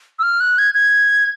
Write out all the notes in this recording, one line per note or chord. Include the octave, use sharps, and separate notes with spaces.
E6
F6
F#6
G#6
G#6